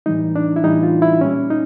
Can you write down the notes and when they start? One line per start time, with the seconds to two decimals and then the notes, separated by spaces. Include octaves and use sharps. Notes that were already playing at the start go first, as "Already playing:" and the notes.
0.06 A2 E3 G3 D#4
0.36 D4
0.56 E4
0.64 A2 E3 G3 D#4
0.83 F4
1.02 E4
1.21 A#2 G3 C#4
1.50 D#4